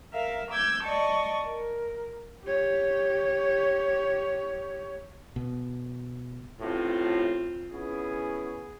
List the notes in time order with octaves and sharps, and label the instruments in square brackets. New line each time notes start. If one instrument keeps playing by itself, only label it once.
[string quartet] A#4 E5 F5
D6 E6 G6 G#6
D5 D#5 A5 C#6
A#4
[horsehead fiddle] G4 C#5
[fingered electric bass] B2
[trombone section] A1 A2 [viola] C4 F4
[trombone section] B3 C#4 E4 [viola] G#4